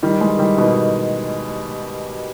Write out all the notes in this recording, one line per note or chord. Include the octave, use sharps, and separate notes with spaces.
D#3 G3
E3 G#3
D#3 G3
B2 D#3